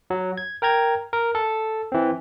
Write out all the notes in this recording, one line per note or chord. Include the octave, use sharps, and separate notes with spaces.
F#3
G#6
A#4 G5 A#5 G#6
A#4
A4
E3 C4